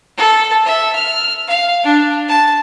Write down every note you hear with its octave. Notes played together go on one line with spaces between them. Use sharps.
A4
E5
F6
F5
D4
A5